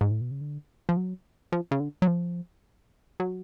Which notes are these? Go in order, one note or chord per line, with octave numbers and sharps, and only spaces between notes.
G#2
A2
B2
C#3
D3
F3
F#3
F3
C#3
D3
F#3
F3
F#3